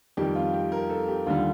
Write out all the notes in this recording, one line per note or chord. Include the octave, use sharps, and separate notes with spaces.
F2 D#3 G3 G4
F4
G4
A#4
A4
G4
D#2 D3 G3 F4